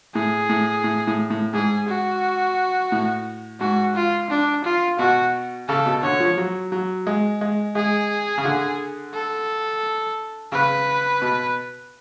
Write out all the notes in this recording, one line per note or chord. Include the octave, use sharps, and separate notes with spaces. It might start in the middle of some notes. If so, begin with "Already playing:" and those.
A2 G#4
A2
A2
A2
A2
G#2 G#4
F#4
A2
G#2 F#4
F4
D4
F4
B2 F#4
C#3 A4
B2
D3 C#5
F3
F#3
F#3
G#3
G#3
G#3 G#4
C#3
D3
A4
C#3 B4
B2